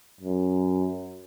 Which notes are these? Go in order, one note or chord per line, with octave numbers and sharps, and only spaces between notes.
F#2